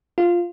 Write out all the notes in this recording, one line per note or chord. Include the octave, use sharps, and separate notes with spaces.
F4